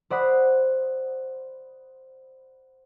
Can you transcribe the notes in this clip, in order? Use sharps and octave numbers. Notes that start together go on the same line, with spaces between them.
C5 D5 F#5 B5 D#6